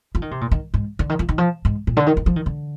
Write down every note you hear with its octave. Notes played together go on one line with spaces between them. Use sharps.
F3
D#3
C3
A#2
D#3
G#2
D3
D#3
F3
D#3
F3
G#2
A#2
D3
D#3
D#3
F3
D#3
D3